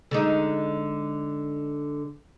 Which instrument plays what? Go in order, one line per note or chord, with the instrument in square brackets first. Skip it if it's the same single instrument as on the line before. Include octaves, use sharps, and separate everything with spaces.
[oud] D3 G#3 D#4